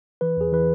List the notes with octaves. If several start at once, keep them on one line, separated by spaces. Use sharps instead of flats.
E3 B4
E2 G#4
E3 B4